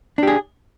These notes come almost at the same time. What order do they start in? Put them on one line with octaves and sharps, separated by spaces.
D4 G4 G#4